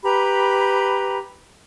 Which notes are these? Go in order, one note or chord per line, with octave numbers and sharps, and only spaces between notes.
G4 B4 A#5 B5